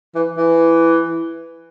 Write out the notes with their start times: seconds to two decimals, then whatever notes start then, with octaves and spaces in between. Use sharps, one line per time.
0.15 E3
0.37 E3